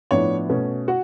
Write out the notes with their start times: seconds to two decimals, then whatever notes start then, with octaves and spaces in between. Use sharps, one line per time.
0.11 A2 F3 B3 D4 C#5
0.49 B2 A3 C#4
0.88 F#4